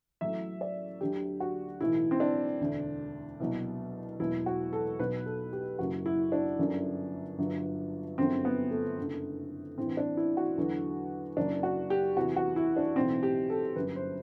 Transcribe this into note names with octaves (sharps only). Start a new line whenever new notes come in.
A1 A2 F#3 E5
D5
D2 D3 F#3 G4
F#4
B1 A2 E3 E4
C4
D4
E1 D2 D3
C2 B2 F#3
E1 E2 B2 F#3 E4
F#4
A4
B1 B2 F#3 B4
A4
G4
F#1 F#2 F#3 F#4
E4
D4
G1 F#2 D3 F#3
G1 G2 F#3
G1 F#2 D3 F#3 C4
B3
A3
F#1 F#2 D3
A1 G2 E3 C4
D4
E4
F#4
E2 D3 F#3
F#1 F#2 F#3 D4
F#4
G4
E2 C3 E3 F#4
F#4
E4
D4
B1 A2 E3 C4
G4
A4
G1 F#2 F#3 B4
C5